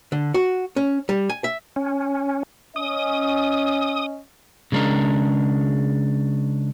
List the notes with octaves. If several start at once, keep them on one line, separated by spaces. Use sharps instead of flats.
D3
F#4
C#4
G3
G#5
E5
C#4
C#4 D#5 D#6
C#3 G#3 D4 A#4